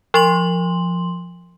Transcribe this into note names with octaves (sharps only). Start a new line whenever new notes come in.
F3 C6 F#7